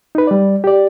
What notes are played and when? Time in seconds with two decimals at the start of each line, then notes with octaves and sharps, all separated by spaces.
0.15 D#4 B4
0.27 G3 D5
0.64 G4 D5